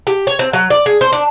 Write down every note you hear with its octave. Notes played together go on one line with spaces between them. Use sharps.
G4
C#5
C4
F#3
D5
G#4
C5
D4